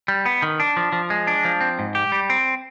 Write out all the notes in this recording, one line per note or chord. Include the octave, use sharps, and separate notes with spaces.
G3
B3
D#3
D4
F3
F3
G#3
D4
F3
C4
G#2
G4
G3
C4